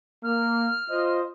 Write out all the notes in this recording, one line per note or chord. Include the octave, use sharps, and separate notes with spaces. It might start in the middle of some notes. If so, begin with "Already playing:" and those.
A#3 F6
F4 C5 D#5